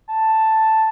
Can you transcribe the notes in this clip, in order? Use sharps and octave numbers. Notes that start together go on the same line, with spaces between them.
A5